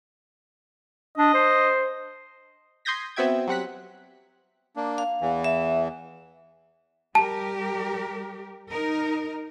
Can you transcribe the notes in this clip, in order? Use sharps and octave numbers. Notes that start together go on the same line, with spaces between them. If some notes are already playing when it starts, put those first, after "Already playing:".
D4 D#5
C5
C6 D#6 G6 G#6 A#6 B6
B3 C4 F#4 E5 G5 G#6
F#3 G3 C4 F#5 F#6 B6
A#3 D4
F5
E2 E3
E5
G3 G4 A#4 A5
D#4 A#4